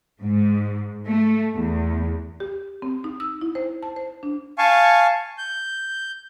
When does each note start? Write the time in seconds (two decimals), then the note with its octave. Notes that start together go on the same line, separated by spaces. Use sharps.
0.23 G#2
1.06 A3
1.56 E2
2.40 G4
2.82 C4
3.04 D#4
3.20 E6
3.41 E4
3.55 C5
3.83 A5
3.96 C5
4.23 D4
4.58 F5 G#5 A5 C#6
5.38 G6